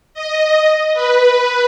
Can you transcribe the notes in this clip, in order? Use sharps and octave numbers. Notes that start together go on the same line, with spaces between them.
D#5
B4